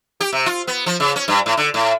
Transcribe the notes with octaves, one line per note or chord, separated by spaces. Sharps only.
G4
C3
F4
B3
F3
C#3
C#4
G2
A2
D3
A2